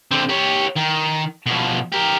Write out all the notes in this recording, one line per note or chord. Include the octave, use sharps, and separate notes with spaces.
D3 C4
G4 C#5
D#3
B2 F3
G4 A#4